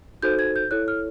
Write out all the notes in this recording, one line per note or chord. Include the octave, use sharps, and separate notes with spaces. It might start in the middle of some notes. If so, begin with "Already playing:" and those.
D#4 F#4 A4 C5 G6
G#6
G6
E4 A4 C#5 F#6
F6